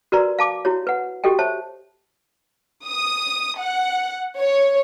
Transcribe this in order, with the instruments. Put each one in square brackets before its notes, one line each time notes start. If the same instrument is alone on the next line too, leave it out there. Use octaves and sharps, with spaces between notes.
[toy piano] F#4 A#4 B4 D5 A#5 C6
F5 A5 D6
E4 F#4 C#5
B4 F#5
F#4 G4 A4 D#5 G5
C5 C#5 E5 A5
[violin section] D#6
F#5
C#5